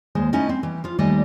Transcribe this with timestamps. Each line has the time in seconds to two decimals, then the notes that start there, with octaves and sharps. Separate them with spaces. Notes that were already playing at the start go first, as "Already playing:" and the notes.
0.15 D#2 G#3 C5
0.33 A3 C#4 D#4 E4 D#5
0.49 C4
0.63 E3
0.84 F3 F4
0.99 D#2 G3 A3 D5 D#5 G#5